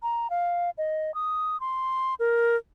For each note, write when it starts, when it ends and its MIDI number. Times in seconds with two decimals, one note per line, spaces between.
0.02 0.30 82
0.30 0.70 77
0.78 1.14 75
1.14 1.59 87
1.60 2.14 84
2.20 2.57 70